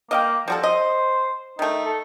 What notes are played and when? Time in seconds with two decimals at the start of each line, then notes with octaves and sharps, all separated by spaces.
0.11 A#3 D#5 F5 G5
0.48 F3 G3 F#4 A4
0.63 C5 D#5
1.59 D#3 A3 D#4
1.86 A4